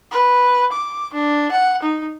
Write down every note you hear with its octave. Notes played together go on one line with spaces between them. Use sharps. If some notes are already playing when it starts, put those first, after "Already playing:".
B4
D6
D4
F#5
D#4